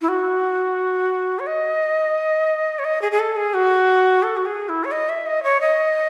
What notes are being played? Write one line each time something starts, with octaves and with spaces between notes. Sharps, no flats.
E4
F#4
C#5
D#5
C#5
D#5
G#4
G#4
A4
G#4
F#4
A4
F#4
G#4
E4
C#5
D#5
E5
D#5
C#5
D#5